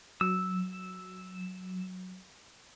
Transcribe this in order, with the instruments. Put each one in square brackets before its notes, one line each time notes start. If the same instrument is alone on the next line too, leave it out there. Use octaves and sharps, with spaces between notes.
[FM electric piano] F#3 [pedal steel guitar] E6